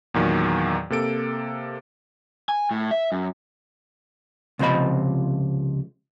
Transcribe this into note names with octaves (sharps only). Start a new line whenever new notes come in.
E2 A#2 D#3 F#3
C3 A#3 A4 D7
G#5
A2
E5
F#2
C#2 C3 F3 C5 D#5 B5